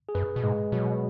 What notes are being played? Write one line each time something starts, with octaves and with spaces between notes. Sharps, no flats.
G#4
F#2 B4
B2
G#2 G#3
B2 F#3